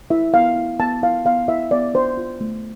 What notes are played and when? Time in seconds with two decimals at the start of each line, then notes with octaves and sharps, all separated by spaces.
0.10 E4 E5
0.34 B3 F5
0.56 E4
0.80 B3 A5
1.02 E4 F5
1.25 B3 F5
1.48 E4 E5
1.71 B3 D5
1.94 D4 C5
2.17 F4
2.41 A3